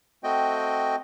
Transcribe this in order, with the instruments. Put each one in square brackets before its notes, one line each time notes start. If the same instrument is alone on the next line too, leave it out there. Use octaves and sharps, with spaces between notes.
[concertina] A3 C4 F#4 D#5 G5